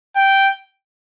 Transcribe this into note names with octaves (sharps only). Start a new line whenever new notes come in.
G5